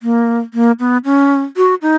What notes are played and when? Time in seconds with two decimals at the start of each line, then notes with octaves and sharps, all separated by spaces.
0.03 A#3
0.54 A#3
0.80 B3
1.05 C#4
1.57 F#4
1.82 D#4